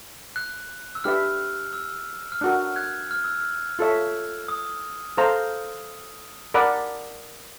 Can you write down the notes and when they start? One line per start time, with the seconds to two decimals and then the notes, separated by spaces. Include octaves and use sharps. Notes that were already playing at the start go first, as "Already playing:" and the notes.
0.36 F#6
0.95 E6
1.04 D4 G4 B4 E5 F6
1.73 E6
2.32 F6
2.41 D4 F#4 A#4 F#6
2.76 F#6 G#6
3.11 F6
3.24 E6
3.39 F6
3.79 F4 A4 C#5 E5
4.48 D#6
5.17 A4 C5 F5 A#5
6.54 A#4 D5 F#5 B5